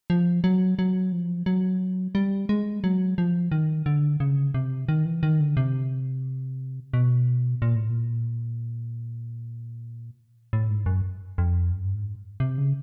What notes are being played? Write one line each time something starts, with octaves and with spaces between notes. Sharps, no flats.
F3
F#3
F#3
F3
F#3
G3
G#3
F#3
F3
D#3
D3
C#3
C3
D#3
E3
D#3
D3
C3
B2
A#2
A2
A#2
A2
G#2
F#2
F2
F#2
G2
G#2
C3
C#3